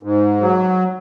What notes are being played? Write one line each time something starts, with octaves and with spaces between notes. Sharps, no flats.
G#2
F#3